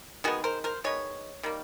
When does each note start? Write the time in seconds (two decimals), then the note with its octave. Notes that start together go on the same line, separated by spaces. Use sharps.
0.24 D#3 G#3 B3 F#4 G#4
0.44 A#4 C5
0.64 A#4 C5
0.84 D#3 G#3 B3 C#5
1.43 D#3 G3 A#3